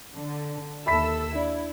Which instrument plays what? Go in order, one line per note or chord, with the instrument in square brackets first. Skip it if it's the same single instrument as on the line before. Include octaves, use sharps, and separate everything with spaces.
[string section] D3
[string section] D#2 A4 E6 [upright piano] E5 B5 B6
[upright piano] D4 [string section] E4